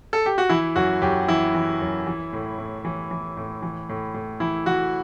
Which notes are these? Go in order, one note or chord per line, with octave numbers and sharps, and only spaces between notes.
A4
G4
F#4
E3 E4
F#2 F#4
F#2 G4
E3 E4
E3
F#2
E3
A2
A2
E3
E3
A2
E3
A2
A2
E3 E4
E3 F#4